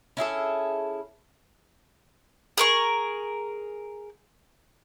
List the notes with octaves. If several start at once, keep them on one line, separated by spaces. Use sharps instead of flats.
C#4 E4 G#4 A4
G#4 A#4 C#6